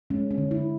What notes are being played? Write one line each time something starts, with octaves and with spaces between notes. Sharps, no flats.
G#3 C#4
C#4
D3
E4